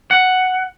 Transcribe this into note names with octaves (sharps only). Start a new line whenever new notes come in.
F#5